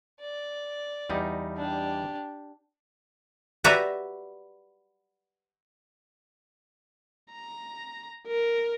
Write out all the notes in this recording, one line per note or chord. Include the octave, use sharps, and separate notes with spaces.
D5
E2 G3 D#4
D4 G4
F#4 G4 B4 D5 E5 A#5
A#5
A#4